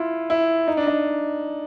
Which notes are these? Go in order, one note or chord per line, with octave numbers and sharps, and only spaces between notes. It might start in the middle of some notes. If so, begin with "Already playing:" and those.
Already playing: E4 F4
E4
D#4
D4
D#4